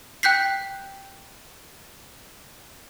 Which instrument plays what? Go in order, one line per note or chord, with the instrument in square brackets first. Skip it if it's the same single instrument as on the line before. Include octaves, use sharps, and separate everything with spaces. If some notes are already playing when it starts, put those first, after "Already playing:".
[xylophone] G5 F#6 G6 B6 C7